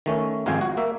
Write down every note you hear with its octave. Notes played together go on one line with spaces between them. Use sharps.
D#3 A3 C#4
G#1 F2 G#3 F5 G5 G#5
F#4
A#3 E5